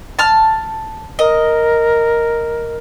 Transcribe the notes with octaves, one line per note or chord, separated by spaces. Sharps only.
A5 F6
A#4 D#5